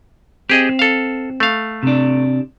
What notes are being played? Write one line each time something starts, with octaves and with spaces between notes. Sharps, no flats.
C4 G4 G#4 D#5
A4 F5
A3 F5
C3 D4